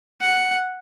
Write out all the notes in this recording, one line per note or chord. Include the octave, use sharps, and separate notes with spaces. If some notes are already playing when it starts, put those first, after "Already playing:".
F#5